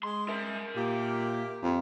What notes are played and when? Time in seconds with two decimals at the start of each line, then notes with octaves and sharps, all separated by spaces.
0.03 G#3 C6
0.29 A#4 E5
0.76 A#2 A#3 G4
1.63 F2